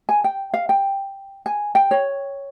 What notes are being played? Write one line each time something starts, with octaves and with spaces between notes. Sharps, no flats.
G#5
G5
F5
G5
G#5
G5
C#5